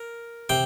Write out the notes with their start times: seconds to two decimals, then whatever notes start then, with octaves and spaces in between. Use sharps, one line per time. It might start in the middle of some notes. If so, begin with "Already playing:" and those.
Already playing: A#4
0.49 C3 G5